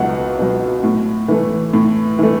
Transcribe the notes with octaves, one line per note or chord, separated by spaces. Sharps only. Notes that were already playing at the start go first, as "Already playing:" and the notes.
Already playing: C#2 B2 F#3 F#5
B2 F#3
A2
E3 A3
A2
E3 A3